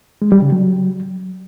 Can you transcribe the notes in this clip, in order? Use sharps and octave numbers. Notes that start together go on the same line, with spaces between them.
G#3
G3
C#3
F#3